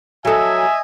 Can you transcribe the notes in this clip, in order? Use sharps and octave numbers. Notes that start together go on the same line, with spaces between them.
F#3 A4 D#5 E5 G#5